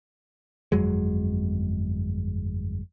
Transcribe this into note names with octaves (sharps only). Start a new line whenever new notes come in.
G1 F2 F#3 G#3